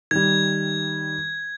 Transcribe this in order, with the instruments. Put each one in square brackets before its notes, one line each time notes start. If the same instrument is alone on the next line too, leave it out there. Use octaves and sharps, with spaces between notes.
[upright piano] D#3 G3 [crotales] G#6